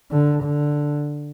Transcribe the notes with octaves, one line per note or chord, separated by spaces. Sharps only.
D3
D3